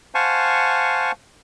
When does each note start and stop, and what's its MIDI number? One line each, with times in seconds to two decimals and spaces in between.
0.15 1.12 72
0.15 1.12 77
0.15 1.12 78
0.15 1.12 80
0.15 1.12 81
0.15 1.12 85